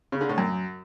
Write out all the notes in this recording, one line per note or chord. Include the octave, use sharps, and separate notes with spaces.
C#3
D3
A2
F#2